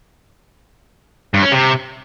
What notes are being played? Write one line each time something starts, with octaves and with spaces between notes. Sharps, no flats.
G2
C#4
C3